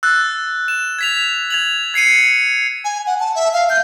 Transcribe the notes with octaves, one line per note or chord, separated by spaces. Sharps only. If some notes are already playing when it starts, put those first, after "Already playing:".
E6 F#6 A6
E7
G#6 B6 F7
G#6 F7 F#7
G#6 C7 C#7 D#7
G#5
F#5
A5
E5
F5
G6